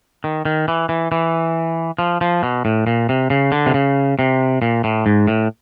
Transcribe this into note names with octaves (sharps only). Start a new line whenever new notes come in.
D#3
D#3
E3
E3
E3
F3
F3
B2
A2
A#2
C3
C#3
D3
C3
C#3
C3
A#2
A2
G#2
A2